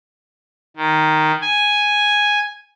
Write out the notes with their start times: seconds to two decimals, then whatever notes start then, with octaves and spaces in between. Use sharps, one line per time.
0.76 D#3
1.42 G#5